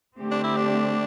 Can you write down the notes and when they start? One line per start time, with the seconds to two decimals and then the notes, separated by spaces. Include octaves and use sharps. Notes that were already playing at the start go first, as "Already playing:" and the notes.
0.18 D3 A3 C4 G4
0.31 D4
0.44 E4
0.56 D4